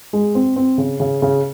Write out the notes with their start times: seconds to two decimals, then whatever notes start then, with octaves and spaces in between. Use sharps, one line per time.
0.13 G#3
0.35 C4
0.56 C4
0.78 C#3
1.00 C#3
1.22 C#3